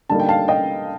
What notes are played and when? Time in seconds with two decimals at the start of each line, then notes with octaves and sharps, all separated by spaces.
0.10 D3 G3 A#3 D#4 A5
0.20 G5
0.29 F5 A5
0.48 D#5 G5